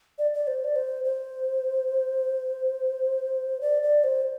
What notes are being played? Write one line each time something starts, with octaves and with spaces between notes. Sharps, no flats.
D5
D5
C5
D5
C5
C5
D5
D5
C5